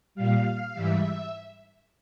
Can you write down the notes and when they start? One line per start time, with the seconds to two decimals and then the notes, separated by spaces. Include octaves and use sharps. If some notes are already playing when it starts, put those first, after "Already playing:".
0.15 A#2 G3 F5
0.73 G#2 E3 G3 E5